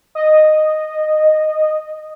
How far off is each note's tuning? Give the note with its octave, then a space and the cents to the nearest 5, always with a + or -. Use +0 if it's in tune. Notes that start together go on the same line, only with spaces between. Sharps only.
D#5 -10